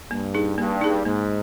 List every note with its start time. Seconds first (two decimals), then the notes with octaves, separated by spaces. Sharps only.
0.11 G2 A#3
0.34 D#4 G#4
0.58 G2 A#3
0.81 D#4 G#4
1.05 G#2 A#3